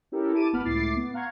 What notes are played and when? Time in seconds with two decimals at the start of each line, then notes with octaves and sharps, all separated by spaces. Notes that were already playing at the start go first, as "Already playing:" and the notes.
0.12 C#4 E4 G4 A4 A#4
0.33 E4 A5 D6 D#7
0.53 G1 B3 F#5 B5 F6
0.65 C#2 A2 E4 D6 A6 C7
0.96 B3
1.14 F5 F#5 A#5 C6 C#6 G#6